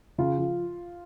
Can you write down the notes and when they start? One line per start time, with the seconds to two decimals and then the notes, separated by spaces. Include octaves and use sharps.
0.18 C#3 F4
0.38 F3